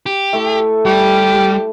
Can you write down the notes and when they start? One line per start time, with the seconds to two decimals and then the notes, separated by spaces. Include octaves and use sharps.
0.06 G4
0.33 A3 E4
0.86 G3 G4